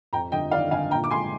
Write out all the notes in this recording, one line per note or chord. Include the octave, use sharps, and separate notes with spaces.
F2 G5 A#5
G1 D#5 G5
D#3 D5 F5
G1 F5 G#5
A#2 G5 A#5
D6
G#3 G#5 C6